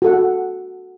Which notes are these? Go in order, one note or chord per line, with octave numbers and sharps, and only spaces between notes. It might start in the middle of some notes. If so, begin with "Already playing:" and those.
F#4 A4 F#5